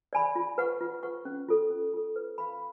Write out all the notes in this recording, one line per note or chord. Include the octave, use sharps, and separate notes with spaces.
D5 G#5 B5
F4
B4 F#5 C#6
F4
B4 F#5 C#6
C#4
F4 A4
C#4
F4 A4
B4
F5 B5